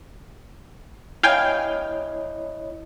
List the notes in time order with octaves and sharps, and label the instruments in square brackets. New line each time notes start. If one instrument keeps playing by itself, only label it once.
[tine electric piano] E4 C#5 D#5 [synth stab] F5 G5 G#5